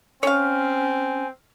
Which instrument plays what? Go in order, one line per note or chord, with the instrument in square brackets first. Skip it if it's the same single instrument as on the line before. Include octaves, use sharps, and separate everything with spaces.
[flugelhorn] C4 [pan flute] C#4 [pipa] C#5 F5 [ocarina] G#5